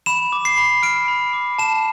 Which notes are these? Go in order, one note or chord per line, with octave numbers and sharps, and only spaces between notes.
B5 E7
D6
C7
B5
F6 D7
B5
D6
A5 E7